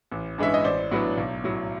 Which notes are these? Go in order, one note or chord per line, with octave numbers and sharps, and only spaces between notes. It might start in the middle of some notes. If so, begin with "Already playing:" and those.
A1
G2 E3 G#3 C#4 E5
D#5
A1 C5 D5
A2 F#3 B3 D4
B1
A2 F#3